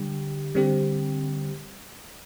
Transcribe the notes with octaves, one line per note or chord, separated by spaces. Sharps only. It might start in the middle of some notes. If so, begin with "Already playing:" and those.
Already playing: D3 G3 G4
D3 G3 C4 G4